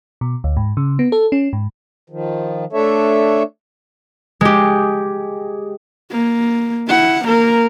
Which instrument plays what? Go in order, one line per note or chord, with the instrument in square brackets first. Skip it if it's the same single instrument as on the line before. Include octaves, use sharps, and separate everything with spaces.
[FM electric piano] B2
D2
G#2
C#3
B3
A4
C#4
G#2
[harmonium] D#3 F3
A3 D4 A4 C#5 E5
[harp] G#3 G4
[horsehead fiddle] A#3
E4 F#5
A#3 A#4